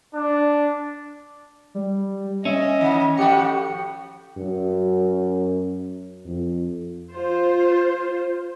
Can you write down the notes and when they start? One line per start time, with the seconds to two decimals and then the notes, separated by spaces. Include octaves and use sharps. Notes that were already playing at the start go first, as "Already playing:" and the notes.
0.14 D4
1.75 G3
2.45 C#4 D#5 E5
2.81 D#3
3.17 A2 F3 F#4 G4 C#7
4.38 F#2
6.25 F2
7.12 F4 C5